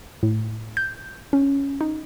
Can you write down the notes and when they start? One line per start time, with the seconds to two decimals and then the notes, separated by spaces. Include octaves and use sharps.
0.23 A2
0.77 G6
1.33 C#4
1.81 D#4